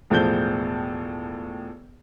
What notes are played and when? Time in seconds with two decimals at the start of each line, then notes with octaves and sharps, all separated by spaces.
0.10 E1 A2 F3 A4 G6 G7